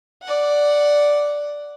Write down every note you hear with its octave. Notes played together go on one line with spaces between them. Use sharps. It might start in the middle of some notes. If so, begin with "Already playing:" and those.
D5 F#5